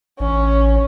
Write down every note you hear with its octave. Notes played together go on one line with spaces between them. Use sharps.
A1 C#4